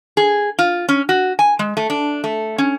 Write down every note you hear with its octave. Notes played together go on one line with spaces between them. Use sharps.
G#4
F4
C#4
F#4
G#5
G#3
A3
D4
A3
C#4